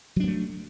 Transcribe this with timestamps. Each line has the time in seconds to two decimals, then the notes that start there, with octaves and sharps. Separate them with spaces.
0.16 F#3
0.20 D4
0.24 B3
0.27 A3